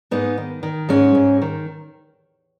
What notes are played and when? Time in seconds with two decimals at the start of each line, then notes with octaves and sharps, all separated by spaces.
0.11 G#2 B3 D#4
0.38 D#3
0.63 D#3
0.89 G#2 G#3 C#4
1.15 G#2
1.42 D#3